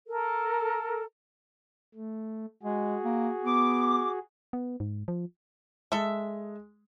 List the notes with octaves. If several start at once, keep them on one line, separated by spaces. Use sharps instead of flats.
A4 A#4
A3
G#3 F#4 G#4
A#3
B3 D6
B3
G#2
F3
G#3 A4 E5